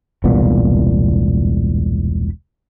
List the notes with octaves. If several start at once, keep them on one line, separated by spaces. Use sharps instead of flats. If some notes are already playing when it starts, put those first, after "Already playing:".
E1 C2 A#2 B3